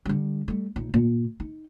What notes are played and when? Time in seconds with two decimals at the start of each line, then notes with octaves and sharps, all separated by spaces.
0.05 D3 G3
0.48 G3 A3
0.76 A#1 D#4
0.94 A#2
1.40 D#4